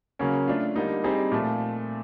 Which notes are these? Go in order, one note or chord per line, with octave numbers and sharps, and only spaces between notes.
C#3 F#3 A#3 C#4
A3 D4 F4
D3 G3 A#3 D#4
G3 C4 D#4 G#4
A#2 F3 A3